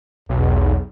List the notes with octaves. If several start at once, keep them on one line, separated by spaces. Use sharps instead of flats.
B1 E2